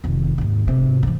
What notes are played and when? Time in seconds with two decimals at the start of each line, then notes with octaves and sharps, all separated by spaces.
0.04 F1 D#3
0.38 D#2 G#2
0.67 G#2 C3
1.03 D3 E3